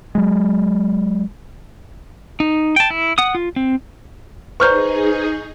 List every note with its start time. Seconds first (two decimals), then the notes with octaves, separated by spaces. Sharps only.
0.15 F#3 G#3
2.40 D#4
2.76 G5 A5
2.90 E4
3.18 F#5 D#6
3.35 F4
3.56 C4
4.60 D#4 G#4 B4 C5 A#5 C#6 F6 G6